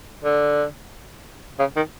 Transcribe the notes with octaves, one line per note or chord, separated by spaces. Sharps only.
D3
C#3
D#3